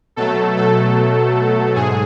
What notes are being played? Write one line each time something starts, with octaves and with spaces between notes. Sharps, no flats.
B2 F#3 A3 A4
A4
G#2 G#4